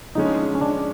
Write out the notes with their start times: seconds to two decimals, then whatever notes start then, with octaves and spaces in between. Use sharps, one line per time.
0.15 D3 F3 G#3 C#4 D#4
0.55 C#4
0.61 D4